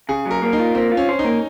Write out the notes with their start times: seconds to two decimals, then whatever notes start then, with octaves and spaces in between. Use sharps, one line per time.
0.09 C#3 G#4
0.26 F#3
0.31 A#4
0.42 A#3
0.53 D#4
0.59 F4
0.75 A#3 C4
0.92 F4
0.97 C#4
1.09 C5
1.19 D#4
1.24 A#3